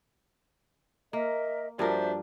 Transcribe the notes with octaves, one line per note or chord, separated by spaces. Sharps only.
A#3 A#4 D#5 E5
G2 F3 D4 F#4 A#4 C5 E5